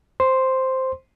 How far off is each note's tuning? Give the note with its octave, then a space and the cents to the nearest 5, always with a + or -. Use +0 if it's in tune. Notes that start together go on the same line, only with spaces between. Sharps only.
C5 +0 C6 +0